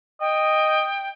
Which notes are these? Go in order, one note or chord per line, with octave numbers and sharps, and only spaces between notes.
D#5 G5